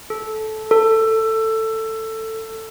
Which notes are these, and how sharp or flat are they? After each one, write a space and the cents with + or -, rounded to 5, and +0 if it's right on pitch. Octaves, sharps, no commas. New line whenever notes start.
A4 -15
A4 +15